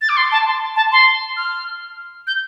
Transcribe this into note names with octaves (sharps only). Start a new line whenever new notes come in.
A6
D6
C6
A5
C6
A5
C6
F6
G6